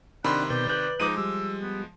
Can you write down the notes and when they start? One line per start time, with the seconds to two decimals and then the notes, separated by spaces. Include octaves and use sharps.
0.24 C3 D#3 D4 F#5 B5 C6
0.50 B2 B4 D5 G6
0.69 B4 F#6 G6
1.00 F3 G#3 D#4 D6 D#7
1.18 G3 E6
1.62 B3